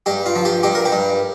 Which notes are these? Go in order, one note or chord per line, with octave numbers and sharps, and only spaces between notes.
G2 G4
F4
F3
G4
G2 G4
A#4
G4
G2